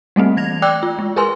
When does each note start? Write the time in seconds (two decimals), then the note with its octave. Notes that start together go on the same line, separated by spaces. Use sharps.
0.16 G3 A3 A#3 C4
0.37 E3 G#6 A#6 F7
0.62 D5 G5 D6 E6 F#6
0.83 F4
0.99 G#3
1.16 G#4 A#4 B4 G#5 C6